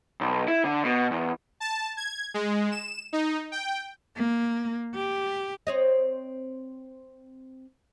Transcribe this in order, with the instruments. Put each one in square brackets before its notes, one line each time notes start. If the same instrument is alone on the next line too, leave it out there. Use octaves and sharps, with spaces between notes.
[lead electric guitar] B1
E4
D3
B2
E2
[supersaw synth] A5
G#6
G#3
E7
D#4
G5
[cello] A#3
G4
[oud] C4 C#5 D#5